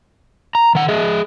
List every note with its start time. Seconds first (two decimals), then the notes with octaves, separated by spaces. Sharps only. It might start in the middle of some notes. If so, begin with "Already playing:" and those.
0.55 A#5
0.75 D#3 F#5
0.89 G#4 D#5 E5